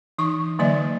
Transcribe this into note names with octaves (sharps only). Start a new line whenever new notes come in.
E3 D#4 C#6
D3 F#3 A#3 D5 D#5